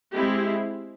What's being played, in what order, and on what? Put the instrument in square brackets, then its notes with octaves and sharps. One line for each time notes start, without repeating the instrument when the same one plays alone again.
[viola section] G#3 C4 E4 G4